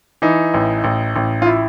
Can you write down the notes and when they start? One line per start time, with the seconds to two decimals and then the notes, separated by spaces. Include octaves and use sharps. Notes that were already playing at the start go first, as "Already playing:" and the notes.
0.22 E3 D#4
0.54 A1
0.84 A1
1.16 A1
1.42 F4
1.46 E4